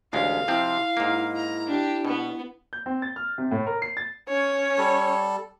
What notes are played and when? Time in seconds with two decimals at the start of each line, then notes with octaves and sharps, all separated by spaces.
0.13 A1 D2 G#3 F5
0.48 C3 F3 C4 E4
0.97 G#2 A#3
1.36 A#5
1.67 D4 G4
2.05 B2 B3
2.73 G6
2.86 C4
3.02 A6
3.16 F6
3.38 C3
3.51 A2
3.67 A#4
3.82 C7
3.97 A6
4.29 C#4 C#5
4.78 G3 A4